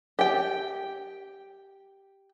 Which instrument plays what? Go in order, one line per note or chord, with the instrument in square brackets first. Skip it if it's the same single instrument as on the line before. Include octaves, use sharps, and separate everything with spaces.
[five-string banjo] G4 G5